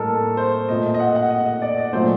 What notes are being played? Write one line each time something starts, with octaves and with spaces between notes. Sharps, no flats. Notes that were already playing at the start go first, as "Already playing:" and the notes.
Already playing: A2 G3 A#3 A4 A#4 D#5
C5
A#2 A3 D#5
D#5
F#5
F#5
D#5
D#5
D5
D#5
A#2 F#3 A3 C5